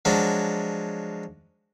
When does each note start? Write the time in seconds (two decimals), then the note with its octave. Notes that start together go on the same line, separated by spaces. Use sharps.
0.05 F3 F#3 G#3 D4